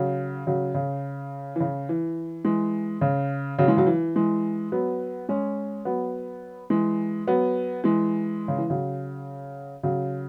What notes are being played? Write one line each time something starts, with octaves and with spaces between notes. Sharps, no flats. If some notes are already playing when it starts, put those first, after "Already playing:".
Already playing: C#3 F#3
C#3 F#3
C#3
E3
C#3
E3
E3 G#3
C#3
C#3 F#3
E3 G#3
C#3 F#3
E3
E3 G#3
F#3 B3
G#3 C#4
F#3 B3
E3 G#3
F#3 B3
E3 G#3
C#3
E3
C#3 F#3
C#3 F#3